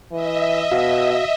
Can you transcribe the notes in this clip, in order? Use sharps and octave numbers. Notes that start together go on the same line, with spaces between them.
E3 D#5 E5
B2 F#4 F5